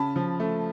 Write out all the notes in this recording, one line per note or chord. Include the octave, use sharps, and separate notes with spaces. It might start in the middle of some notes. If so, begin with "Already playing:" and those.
Already playing: C#3 A5 B5
F3
A3